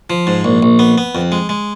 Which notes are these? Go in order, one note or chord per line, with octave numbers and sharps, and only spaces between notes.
F3
G#2
A#1
A#1
B3
B3
F2
G#3
G#3